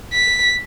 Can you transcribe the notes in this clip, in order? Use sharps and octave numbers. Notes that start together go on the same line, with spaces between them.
B6